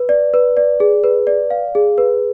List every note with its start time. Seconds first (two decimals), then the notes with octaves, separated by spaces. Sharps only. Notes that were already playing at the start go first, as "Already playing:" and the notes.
Already playing: B4
0.09 D5
0.34 B4
0.57 D5
0.80 G#4
1.04 B4
1.27 D5
1.50 F5
1.75 G#4
1.98 B4